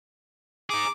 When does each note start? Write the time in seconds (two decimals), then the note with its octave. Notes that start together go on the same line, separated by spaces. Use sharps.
0.70 D#4 G#4 D6